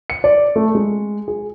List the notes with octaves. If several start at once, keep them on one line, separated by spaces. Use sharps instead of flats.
C#7
D5
A3
G#3
G#4